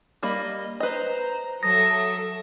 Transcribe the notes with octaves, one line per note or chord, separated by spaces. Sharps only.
G3 A#3 D#5 B5
B4 C5 D#5 A#5
F#3 A4 E5 D#6 A#6